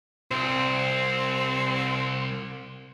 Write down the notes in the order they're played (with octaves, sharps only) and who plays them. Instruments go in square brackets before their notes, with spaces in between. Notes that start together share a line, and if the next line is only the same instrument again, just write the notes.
[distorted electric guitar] C2 [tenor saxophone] C4